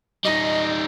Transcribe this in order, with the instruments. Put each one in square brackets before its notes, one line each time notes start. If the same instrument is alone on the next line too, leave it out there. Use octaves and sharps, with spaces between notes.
[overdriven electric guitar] G3 D#4 [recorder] D#5